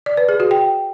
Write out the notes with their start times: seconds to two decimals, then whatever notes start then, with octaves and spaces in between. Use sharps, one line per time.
0.06 D5
0.17 B4
0.29 G#4
0.40 F#4
0.51 G5